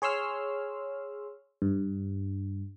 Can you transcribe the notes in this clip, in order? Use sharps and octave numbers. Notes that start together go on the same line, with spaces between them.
G#4 C#5 C6 E6 F6
G2